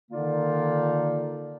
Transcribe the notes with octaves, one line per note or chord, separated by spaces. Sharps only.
D3 D#3 A#3 D#4 F4 D5